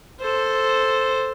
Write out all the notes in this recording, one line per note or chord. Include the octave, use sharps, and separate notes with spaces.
A4 C5